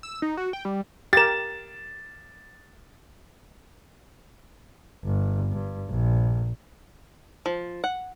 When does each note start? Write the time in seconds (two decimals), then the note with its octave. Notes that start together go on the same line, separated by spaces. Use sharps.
0.03 E6
0.22 D#4
0.37 F#4
0.53 G5
0.65 G3
1.13 G4 A#4 A6 E7
5.04 G1
5.51 G2
5.90 A#1
7.46 F3
7.84 F#5